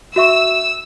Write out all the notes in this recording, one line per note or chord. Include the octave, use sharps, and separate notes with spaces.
F#4 E5 C#6 E6